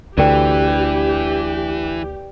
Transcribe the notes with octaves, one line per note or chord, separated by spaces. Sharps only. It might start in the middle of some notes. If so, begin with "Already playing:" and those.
D2 D3 E3 G4 B4 D5 G5